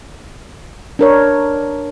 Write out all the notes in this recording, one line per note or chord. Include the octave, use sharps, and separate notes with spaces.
D4 A#4 C#5